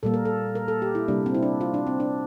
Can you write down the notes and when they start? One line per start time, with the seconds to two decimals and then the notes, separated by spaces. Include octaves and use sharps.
0.03 A#2 G3 A#3 A4
0.14 A#4
0.25 A4
0.55 A#4
0.68 A4
0.82 G4
0.95 E4
1.08 C3 G3 A#3 D4
1.26 C4
1.35 E4
1.43 D4
1.61 F4
1.74 D4
1.87 C4
2.00 D4